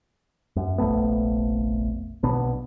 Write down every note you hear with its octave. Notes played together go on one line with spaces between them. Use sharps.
F#2
F1 A#1 A3 B3
B1 B2 B3 D4